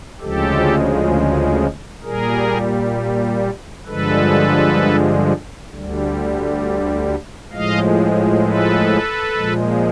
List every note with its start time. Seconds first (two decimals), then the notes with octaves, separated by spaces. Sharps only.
0.20 D2 C#3 F3 G#3 G4 A4
2.03 A#2 G3 G#4 A#4
3.86 G2 D3 F3 G#3 A4 B4
5.69 D2 D3 G3
7.52 A2 F3 G#3 D#5 F5
8.43 A4 B4
9.35 A#2 F3 G#3